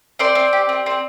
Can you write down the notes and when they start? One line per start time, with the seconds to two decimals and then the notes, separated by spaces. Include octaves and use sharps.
0.19 C4 C5 D5
0.35 C4
0.53 G4
0.69 C4
0.86 C4